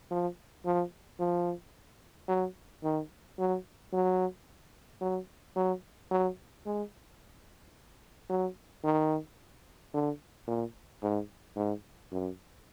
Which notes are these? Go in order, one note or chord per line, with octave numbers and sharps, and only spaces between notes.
F3
F3
F3
F#3
D#3
F#3
F#3
F#3
F#3
F#3
G#3
F#3
D#3
D3
A#2
G#2
G#2
F#2